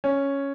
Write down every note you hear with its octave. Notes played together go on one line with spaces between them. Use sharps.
C#4